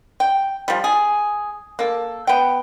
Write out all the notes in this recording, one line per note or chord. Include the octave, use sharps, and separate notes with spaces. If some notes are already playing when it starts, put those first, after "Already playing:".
G5
F3 G3
G#4
A#3 A4
B3 G5